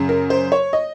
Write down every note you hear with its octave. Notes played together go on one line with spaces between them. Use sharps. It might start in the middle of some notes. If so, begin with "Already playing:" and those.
Already playing: F#2 C#3
A#4
C5
C#5
D#5